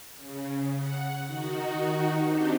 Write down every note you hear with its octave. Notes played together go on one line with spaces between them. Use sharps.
C#3
F#5
D#3 D#4 F#4
C4 D4 D#4 G4